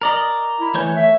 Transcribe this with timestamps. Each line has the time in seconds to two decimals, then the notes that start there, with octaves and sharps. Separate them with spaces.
0.01 A#4 D5 D#5
0.61 E4
0.74 E3 A3 C#5 G6
0.96 E5